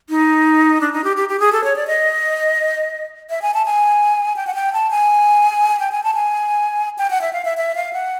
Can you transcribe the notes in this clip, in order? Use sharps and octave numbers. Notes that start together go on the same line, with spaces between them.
D#4
D4
D#4
G4
G4
G4
G#4
A4
C#5
D5
D#5
E5
G#5
A5
G#5
G5
F#5
G5
A5
G#5
G5
G#5
A5
G#5
G5
F#5
E5
F5
E5
E5
F5
F#5